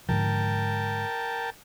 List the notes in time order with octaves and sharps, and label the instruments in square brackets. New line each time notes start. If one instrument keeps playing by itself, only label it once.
[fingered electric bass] G#2 D3 F3 [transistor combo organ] A#4 G5 A5